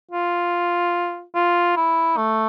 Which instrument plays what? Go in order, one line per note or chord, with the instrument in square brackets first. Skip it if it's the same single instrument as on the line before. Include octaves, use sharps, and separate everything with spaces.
[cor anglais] F4
F4
E4
A3